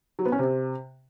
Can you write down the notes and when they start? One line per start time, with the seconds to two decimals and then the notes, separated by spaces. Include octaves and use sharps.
0.19 F#3
0.25 B3
0.32 C#4
0.39 C3